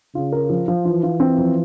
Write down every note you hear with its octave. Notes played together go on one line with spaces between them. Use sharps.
C#3 F4
A#4
F3
F3
E3 F4
F4
C4
F3